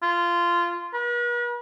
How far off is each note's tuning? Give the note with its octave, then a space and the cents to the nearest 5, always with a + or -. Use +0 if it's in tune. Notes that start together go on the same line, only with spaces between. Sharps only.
F4 -15
B4 -45